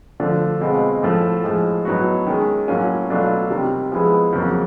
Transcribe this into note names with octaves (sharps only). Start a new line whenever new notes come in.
D3 F3 A3 D4
B2 G#3 C4 F4
A2 F3 A3
A2 F3 G#3
A2 F#3 B3 D#4 F#4
D#3 G#3 C#4
A2 F#3 A#3 C#4 F4
B2 F#3 A3 D4 F4
C3 D#3 G3
F3 G#3 B3 E4 G#4
F2 C#3 F#3 A#3